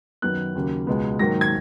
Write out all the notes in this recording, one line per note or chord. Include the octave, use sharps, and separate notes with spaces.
F#2 D#3 F#3 B3 F#6
D#2 C#3 F#3 A#3
C#2 B2 G#3 B3
G#2 D#3 F#3 A#3 A#6
G#6